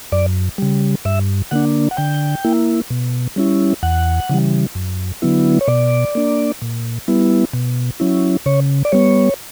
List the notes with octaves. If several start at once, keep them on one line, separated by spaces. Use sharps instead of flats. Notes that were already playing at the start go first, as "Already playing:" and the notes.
F#2 D5
C#3 G3
G2 E5
D3 A#3 D4 F#5
F#5
D3 G5
A#3 E4
B2
G3 C#4 E4
E2 F#5
C#3 E3 G3
F#2
D3 F#3 B3 E4
C#5
B2 D5
A#3 D4
A#2
G3 B3 E4
B2
F#3 C#4 E4
C#3 C#5
D5
G3 B3 C#5